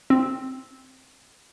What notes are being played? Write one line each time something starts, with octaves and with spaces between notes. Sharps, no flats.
C4